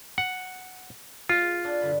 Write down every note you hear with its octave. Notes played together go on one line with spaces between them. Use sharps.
F#5
G#3 F4
D4 D#5 F#5
G2 D3 B5